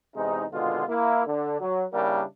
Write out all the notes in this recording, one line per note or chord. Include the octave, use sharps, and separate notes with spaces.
E2 C3 G#3 D#4
G#1 B2 D3 G#3 F4
A#3 E4
D3
F#3
C#3 G3 A#3 D4 E4 A#4